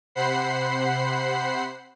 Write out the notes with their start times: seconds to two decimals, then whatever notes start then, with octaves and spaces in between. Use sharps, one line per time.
0.15 C3 C5 F#5 B5 C7